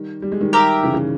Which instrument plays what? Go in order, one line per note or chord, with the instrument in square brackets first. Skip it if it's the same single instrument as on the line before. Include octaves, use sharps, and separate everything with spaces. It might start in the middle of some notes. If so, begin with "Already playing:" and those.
Already playing: [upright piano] D#3 G3
G3
G#3
D#3 G3
[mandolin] G4 A#4 E5
[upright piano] C#3 E3
C#3 E3